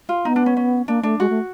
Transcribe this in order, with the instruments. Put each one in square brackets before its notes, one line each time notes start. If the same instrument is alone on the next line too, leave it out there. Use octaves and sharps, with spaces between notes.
[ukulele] F4
[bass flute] B3 [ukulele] D#4
[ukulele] D4
C#4
C#4
[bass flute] A#3 [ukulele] D4
[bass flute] A3 [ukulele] D4
[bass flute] G#3 [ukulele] F#4
[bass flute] A3